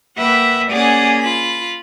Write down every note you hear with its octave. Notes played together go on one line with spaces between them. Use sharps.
A#3 B4 E5 F#5 G5
A#3 C#4 G#4 D5 F#5
F4 B5